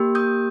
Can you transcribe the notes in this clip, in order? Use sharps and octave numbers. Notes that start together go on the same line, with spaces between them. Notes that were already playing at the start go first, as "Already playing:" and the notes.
Already playing: A#3 G4
D#6 G6